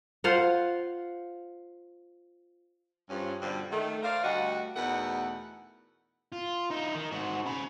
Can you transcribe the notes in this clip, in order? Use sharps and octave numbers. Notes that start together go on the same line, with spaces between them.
F4 C5 F5 F#5
G2 F3 C#4
G2 B2 D3 F3 G3
D#3 A3
A#4 C5 D5 F5
D2 G3 F#4 G4 D#5 F#5
E2 B2 A3 D#4 A#4 F#5
F4
D#4 E4
D#3
G#2 F#4
C#4 B5